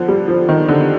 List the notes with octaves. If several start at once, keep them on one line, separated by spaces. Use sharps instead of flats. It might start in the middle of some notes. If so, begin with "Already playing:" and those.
Already playing: D3 F3
G3
F3
D#3
D3